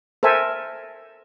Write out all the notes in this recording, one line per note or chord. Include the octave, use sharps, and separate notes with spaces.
A4 A#4 C5 E5 G#5